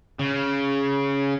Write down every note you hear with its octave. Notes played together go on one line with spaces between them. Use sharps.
C#3